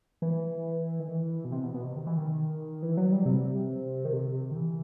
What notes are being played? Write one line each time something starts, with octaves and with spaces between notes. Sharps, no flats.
E3
D#3
E3
B2
C3
B2
B2
C3
D#3
E3
D#3
E3
F#3
G3
C3
D#3
C3
D#3
E3